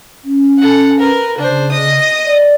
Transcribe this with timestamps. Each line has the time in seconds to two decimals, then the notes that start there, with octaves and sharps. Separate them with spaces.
0.24 C#4
0.58 A4 F#5
0.99 A#4 B4
1.38 C#3 D4 C5
1.71 D#5 D#6
2.25 D5